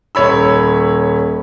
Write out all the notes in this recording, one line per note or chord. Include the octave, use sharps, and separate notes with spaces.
D#1 C#5 B5 E6